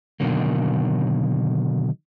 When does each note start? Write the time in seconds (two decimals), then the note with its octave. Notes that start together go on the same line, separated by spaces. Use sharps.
0.20 B2 D3 D#3 F#3 A#3